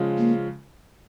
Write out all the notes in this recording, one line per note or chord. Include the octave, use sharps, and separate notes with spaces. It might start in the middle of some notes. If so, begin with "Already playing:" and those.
Already playing: C#3 F3 G#3 F4
A#3